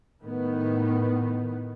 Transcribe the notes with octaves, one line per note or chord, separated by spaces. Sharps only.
A2 D#3 B3